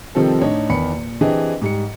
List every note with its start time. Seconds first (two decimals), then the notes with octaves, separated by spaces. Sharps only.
0.15 C3 D#3 F3 G3 C4 A4
0.41 A2 D4 D#4 C#5
0.70 E2 D#3 B5 C#7
0.92 A#2
1.21 E3 C4 D4 G4 G#4 D#5
1.62 G#2 G3 C#7